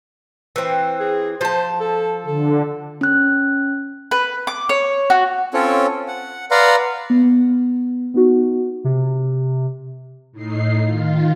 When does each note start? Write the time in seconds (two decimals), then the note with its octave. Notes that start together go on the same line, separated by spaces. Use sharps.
0.56 E3 C4
1.00 G#4
1.41 F3 C5 A5
1.80 A4
2.26 D3 A4
3.01 C#4 F#6
4.11 B4
4.47 D6
4.69 C#5
5.10 F#4
5.54 C4 C#4 F4 A4 C#5
6.08 F#5
6.51 B4 D5 F5 F#5 A#5 C6
7.10 B3
8.14 B3 D#4 F#4
8.84 C3
10.32 A2 D#4 C7
10.84 D#3 F4